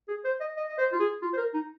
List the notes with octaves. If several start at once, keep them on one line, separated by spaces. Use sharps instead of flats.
G#4
C5
D#5
D#5
D#5
C5
F4
G#4
F4
C5
A#4
D#4